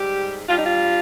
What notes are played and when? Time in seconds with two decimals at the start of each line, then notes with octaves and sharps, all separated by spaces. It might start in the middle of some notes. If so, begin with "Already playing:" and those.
Already playing: G#2 G3 G4
0.48 G2 G3 F4
0.57 D#4
0.64 F4